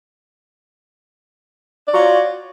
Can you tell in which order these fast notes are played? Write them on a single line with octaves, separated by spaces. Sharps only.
D5 F#4 F4 C#5